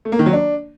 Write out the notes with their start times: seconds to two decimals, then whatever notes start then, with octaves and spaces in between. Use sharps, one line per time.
0.05 A3
0.12 A#3
0.19 D#3
0.26 F#3
0.33 D4